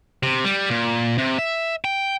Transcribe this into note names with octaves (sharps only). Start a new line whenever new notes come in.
C3
G3
A#2
C3
E5
G5